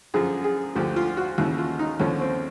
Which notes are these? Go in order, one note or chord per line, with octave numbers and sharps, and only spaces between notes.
F#2 D3 F3 G#4
G#4
D2 D3 F3 G4
F4
F#4
D#2 C#3 E3 F#4
F4
D#4
D#2 D3 F3 C#4
C4